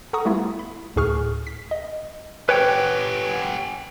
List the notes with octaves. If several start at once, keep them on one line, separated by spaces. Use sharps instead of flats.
A4 F#5 A#5 C#6 D#6
G3 A3 B3 E4 F4
B5
D2 A2 G#4 C#6 F6
B6
D#5
C#4 G4 B4 C#5 G5